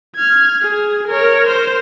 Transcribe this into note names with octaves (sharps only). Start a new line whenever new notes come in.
F6 G#6
G#4
A#4 C#5
C5